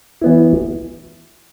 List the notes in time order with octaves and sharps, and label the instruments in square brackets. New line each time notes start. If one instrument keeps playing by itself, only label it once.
[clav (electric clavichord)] E3 B3 E4